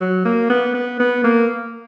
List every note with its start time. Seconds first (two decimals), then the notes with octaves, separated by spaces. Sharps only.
0.01 F#3
0.25 A#3
0.50 B3
0.75 B3
1.00 B3
1.24 A#3